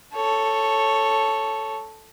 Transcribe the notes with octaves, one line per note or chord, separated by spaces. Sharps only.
A4 C#5